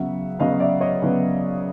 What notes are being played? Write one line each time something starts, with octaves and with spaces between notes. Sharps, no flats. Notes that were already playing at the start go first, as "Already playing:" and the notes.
Already playing: C#3 F#3 B3 E5 F#5
C#3 F#3 B3 D#5 F5
D#5
D5 E5
C#5 D#5
C#3 F#3 B3